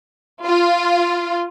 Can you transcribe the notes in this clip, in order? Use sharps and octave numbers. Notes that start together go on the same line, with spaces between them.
F4